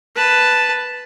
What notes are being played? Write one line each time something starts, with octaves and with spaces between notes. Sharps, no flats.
B4 A5